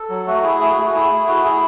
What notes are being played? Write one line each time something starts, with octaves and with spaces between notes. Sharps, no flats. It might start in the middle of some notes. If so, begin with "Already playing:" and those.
Already playing: A4
F#3
A3 F#4
E4 G#4
A3 G#4
F#4
A3 G#4
F#4
E4 G#4
A3
E4 F#4
E4 G#4